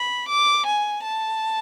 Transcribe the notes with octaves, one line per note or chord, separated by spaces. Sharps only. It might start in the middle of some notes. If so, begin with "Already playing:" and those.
Already playing: B5
D6
G#5
A5